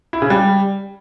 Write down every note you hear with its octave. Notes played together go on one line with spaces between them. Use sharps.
E4
C#3
G3